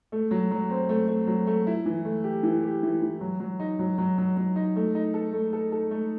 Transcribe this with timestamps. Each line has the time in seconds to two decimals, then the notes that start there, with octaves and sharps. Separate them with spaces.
0.12 A3
0.31 F#3
0.51 F#3
0.70 C4
0.89 A3
1.08 A3
1.27 F#3
1.47 A3
1.67 E4
1.86 E3
2.05 A3
2.24 G4
2.43 E3
2.63 G4
2.83 E3
3.02 E3
3.21 F#3
3.40 F#3
3.60 D#4
3.79 F#3
3.98 F#3
4.18 F#3
4.37 F#3
4.56 D#4
4.76 A3
4.95 D#4
5.14 A4
5.33 A3
5.53 A4
5.72 A4
5.91 A3